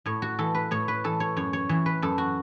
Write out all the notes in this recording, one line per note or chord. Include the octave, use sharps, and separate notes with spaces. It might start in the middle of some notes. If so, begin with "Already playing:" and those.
A2 C#5
F#4
E3 A4
B4
A2 C#5
B4
E3 A4
C#5
F#2 C#5
C#5
E3 C#5
B4
F#2 A4
F#4